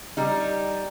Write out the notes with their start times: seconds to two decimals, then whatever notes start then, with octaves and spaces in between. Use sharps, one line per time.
0.17 G3 D#4